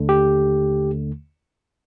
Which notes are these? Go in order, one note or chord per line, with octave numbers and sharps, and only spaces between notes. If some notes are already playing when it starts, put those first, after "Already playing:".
Already playing: D#2 D3 A3
G4